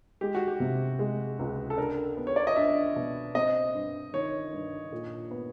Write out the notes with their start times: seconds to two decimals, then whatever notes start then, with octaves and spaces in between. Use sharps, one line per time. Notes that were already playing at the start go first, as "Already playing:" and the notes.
0.21 G#3 G4
0.35 F#4
0.48 G4
0.60 C3
0.99 G#3
1.39 C#2
1.70 A4
1.77 D4 A#4
2.17 B3
2.27 C#5
2.36 D5
2.47 D#5
2.56 D4 E5
2.96 B2
3.35 C4 D#5
3.74 G2
4.13 D#3 C#5
4.52 G2
4.92 A#2
5.31 B3